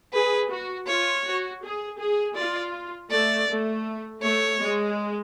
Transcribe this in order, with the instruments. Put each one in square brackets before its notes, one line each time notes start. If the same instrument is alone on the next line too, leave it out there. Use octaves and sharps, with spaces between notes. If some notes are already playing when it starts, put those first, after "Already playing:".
[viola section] G#4 [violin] B4
[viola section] F#4
[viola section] F4 [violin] C#5
[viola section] F#4
G#4
G#4
[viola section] F4 [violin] D5
[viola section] A3 [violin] D5
[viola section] A3
[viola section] A3 [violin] C#5
[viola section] G#3